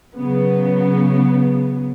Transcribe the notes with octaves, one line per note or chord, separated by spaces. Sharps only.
C#3 F#3 B3